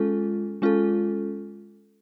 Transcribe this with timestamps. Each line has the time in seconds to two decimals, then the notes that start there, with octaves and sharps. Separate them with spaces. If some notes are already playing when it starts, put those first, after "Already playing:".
Already playing: G#3 C#4 F4 A4
0.62 G#3 C#4 F4 A4